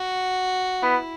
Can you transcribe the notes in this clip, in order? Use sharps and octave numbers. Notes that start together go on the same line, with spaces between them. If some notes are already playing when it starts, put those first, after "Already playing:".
Already playing: F#4
B3 E4